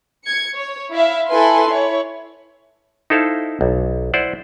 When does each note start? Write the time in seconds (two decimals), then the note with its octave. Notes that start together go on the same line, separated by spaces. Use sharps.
0.24 G#6 C#7
0.56 C#5
0.91 E4 E5 F5
1.29 E4 A4 B4 G#5 C6
1.70 E4 C#5
3.10 D#4 E4 A4 C5 F5
3.61 B1
4.14 E4 C5 D5 F#5